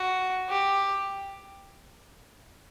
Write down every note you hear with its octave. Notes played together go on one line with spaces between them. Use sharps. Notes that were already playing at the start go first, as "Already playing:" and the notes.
Already playing: F#4
G4